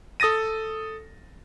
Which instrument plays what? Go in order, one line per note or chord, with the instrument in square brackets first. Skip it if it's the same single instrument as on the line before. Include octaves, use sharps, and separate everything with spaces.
[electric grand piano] A4 D#6 A6 A#6 D#7